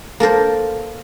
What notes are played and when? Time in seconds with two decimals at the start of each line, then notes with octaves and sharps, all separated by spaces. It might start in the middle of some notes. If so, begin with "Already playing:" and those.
0.20 A#3 A4 A#4 C5